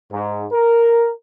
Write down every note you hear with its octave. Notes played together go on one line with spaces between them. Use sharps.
G#2
A#4